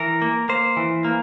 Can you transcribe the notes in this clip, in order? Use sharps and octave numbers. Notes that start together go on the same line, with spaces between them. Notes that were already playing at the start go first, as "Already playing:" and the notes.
Already playing: E3 A#4
A#3
A#3 C5
E3
A#3